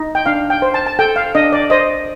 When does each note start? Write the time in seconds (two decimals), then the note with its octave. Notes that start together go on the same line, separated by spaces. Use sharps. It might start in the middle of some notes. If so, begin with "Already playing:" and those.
Already playing: D#4
0.15 G5
0.26 D4 F5
0.50 G5
0.62 C5
0.74 A5
0.86 A5
0.99 A4 G5
1.16 F5
1.35 D4 D#5
1.53 D5
1.70 C5 D#5